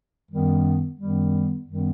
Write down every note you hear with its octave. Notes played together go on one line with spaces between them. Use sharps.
F#2 D#3 G3 B3
F#2 D#3 G3 B3
F#2 D#3 G3 B3